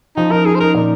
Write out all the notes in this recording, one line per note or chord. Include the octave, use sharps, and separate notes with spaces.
F3 D#4
D#4 A#4
D#4 G#4
C5
D#4 A#4
A#2